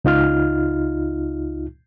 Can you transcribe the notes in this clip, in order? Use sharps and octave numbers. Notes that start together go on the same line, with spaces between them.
C#2 D#4 F4 F6